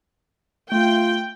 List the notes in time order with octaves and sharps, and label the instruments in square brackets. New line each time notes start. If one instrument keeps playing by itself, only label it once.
[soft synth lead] A3 [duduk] F4 [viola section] G5